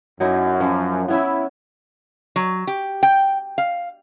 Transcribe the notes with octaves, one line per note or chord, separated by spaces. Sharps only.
F#2 F#3 D#4 E4
F3 C#4
B3 C#4 E4 E5
F#3
G4
G5
F5